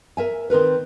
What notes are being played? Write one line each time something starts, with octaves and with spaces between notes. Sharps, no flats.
A#4 E5 G#5
D#3 C4 A#4 B4